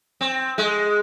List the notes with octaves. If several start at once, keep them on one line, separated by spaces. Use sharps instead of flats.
C4
G#3